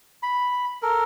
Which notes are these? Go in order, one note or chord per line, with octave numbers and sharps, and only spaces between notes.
B5
A4 A#4